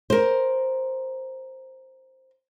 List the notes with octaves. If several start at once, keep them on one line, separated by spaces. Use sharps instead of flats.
A#4 C5